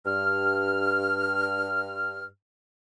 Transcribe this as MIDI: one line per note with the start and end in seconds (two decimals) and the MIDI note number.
0.05 2.25 43
0.05 2.25 89